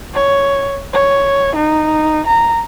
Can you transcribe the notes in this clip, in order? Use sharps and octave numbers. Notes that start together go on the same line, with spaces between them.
C#5
C#5
D#4
A#5